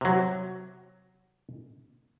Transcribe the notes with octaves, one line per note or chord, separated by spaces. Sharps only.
C3 F#3